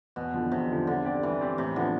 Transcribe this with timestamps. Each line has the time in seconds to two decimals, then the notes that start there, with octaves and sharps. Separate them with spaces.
0.16 E2 B2
0.34 D3 F3
0.52 E2 C3
0.69 D3 F3
0.87 D3 G3
1.05 C4 G4 D5
1.23 E3 G3
1.41 C4 G4 D5
1.58 A2 C3
1.76 D3 F3 B3